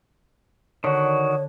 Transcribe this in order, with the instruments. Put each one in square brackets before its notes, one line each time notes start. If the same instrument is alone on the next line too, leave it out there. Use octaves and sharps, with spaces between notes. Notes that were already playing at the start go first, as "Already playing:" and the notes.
[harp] D3 [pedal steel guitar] D#3 F#4 [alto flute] C#5